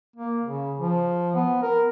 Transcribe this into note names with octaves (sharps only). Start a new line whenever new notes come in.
A#3
C#3
F3
B3
A#4